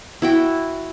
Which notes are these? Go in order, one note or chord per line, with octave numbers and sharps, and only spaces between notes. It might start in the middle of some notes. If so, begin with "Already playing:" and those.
E4 F#4 G5